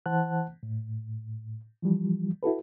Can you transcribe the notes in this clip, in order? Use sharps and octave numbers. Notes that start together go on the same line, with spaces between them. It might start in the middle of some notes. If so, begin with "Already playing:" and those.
E3 C5 F#5 A5 F#6
A2
E3 F3 G3
E4 F#4 A4 B4